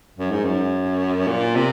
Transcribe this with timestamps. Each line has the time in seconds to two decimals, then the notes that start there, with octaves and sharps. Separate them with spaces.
0.18 F#2
0.31 G#2
0.44 F#2
1.27 A#2
1.55 C3